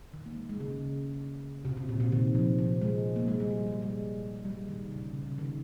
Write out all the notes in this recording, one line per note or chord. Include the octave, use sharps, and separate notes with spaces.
D#3
A#3
G#3
G#3
C#3
C3
C3
A#2
C3
D#3
F3
F3
G#3
A#3
G#3
G3
G3
G3
G#3
G3
D#3
C#3
C3
C#3
D#3